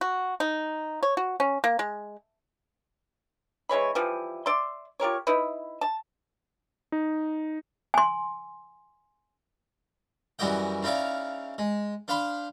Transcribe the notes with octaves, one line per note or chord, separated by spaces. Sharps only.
F#4
D#4
C#5
F#4
C#4
A#3
G#3
E3 G#3 C#5 B5
E3 F3 G3
D5 E5 C6
F4 G4 A#4 C#5
D#4 E4 B4
A5
D#4
G#5 C6
F#2 E3 G3 F#4 D#5 G5
C#3 D#4 E4 D5 F5
G#3
D4 C5 F5 B5 C6